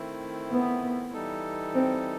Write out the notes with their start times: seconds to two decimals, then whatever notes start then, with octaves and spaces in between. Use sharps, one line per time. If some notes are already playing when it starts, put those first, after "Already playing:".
Already playing: D#3 A3 C4 E4
0.51 B3
1.13 E3 G3 D#4 A4
1.75 C4